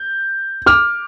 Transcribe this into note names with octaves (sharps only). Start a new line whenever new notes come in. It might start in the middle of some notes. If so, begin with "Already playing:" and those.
Already playing: G6
D6 F6